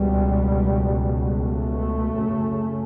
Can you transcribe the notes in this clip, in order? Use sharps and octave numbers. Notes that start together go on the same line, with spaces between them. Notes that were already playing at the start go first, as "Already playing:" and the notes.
Already playing: C#2 B2 G3
A3
F#2 C#3